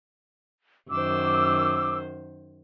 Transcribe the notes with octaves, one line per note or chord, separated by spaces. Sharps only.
F#2 D#3 C5 D6 E6